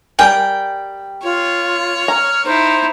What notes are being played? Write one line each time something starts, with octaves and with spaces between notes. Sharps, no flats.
G3 A#4 G5 G#5
F4 C#5
A#5 F6
D#4 E4 C5